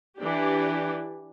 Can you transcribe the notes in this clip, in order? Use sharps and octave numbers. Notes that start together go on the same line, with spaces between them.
E3 D4 G4